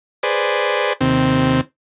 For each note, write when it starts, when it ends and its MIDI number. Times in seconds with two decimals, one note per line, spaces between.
0.23 0.93 68
0.23 0.93 71
0.23 0.93 72
0.23 0.93 74
1.01 1.61 39
1.01 1.61 48
1.01 1.61 60